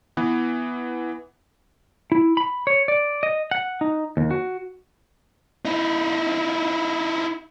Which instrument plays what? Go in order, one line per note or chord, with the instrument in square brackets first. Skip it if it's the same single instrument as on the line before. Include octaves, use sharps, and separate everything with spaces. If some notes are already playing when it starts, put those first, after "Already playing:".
[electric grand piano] E3 B3
[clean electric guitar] E4
B5
C#5
D5
D#5
F#5
D#4
D#2
F#4
[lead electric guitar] D#4 E4